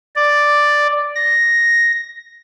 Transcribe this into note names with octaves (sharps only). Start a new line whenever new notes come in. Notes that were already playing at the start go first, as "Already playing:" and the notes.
D5
A#6